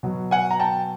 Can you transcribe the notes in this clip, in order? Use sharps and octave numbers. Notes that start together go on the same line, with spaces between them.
B2 F#3
F#5 G#5
A#5
G5 A5